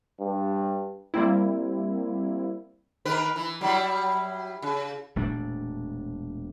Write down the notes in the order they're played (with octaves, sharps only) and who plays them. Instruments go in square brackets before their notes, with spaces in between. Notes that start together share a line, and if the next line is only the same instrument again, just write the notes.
[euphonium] G2
[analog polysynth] G3 A#3 C4 E4
[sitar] D#3 A#4 B4
E3
F#3 G3 E4
C#3
[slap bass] E1 A#2 A3 D4